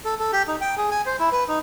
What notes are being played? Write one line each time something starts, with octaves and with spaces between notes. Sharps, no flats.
A4
A4
G4
D#4
G5
G#4
G#5
C5
E4
B4
D#4